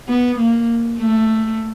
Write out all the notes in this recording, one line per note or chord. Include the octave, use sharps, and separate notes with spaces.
B3
A#3
A3